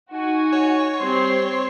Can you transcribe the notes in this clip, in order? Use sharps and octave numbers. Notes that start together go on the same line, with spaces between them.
D#4 F#4 G#5
C#5
G3 C4 C6